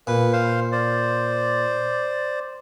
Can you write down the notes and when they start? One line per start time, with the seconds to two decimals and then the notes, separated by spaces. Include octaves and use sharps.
0.07 A#2 B4
0.33 C5 F5 C6
0.72 C5 D5